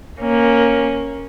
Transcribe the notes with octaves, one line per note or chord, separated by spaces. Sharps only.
A#3 C#4